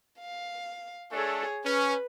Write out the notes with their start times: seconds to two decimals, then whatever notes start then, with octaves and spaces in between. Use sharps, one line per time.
0.19 F5
1.12 A3 D4 G#4 A4 C#5
1.64 C#4 B4